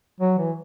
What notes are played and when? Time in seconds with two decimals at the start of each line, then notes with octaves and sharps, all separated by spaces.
0.21 F#3
0.38 E3